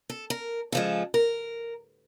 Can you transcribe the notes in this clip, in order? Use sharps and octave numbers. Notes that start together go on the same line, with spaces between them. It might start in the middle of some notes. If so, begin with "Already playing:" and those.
A4
A#4
C#3 F3 G#3 A4
A#4